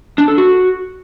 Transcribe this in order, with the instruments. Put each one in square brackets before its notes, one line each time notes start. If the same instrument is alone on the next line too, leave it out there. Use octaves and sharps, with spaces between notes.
[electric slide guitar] D4
A4
F#4